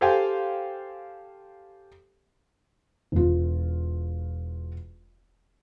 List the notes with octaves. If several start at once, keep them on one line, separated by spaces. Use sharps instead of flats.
G4 A4 C5 F5 G5 G#5
E1 F4